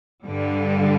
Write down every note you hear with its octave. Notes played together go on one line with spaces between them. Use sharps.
G2 D3 G3